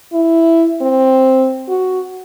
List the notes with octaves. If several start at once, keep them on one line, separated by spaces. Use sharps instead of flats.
E4
C4
F#4